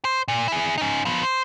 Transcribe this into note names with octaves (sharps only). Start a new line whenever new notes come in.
C5
A#2
E4 G#4
C#4 D#4
F3 B3
C5